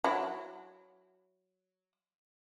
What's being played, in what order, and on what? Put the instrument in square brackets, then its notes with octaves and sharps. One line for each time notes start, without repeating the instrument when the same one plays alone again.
[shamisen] F#3 E4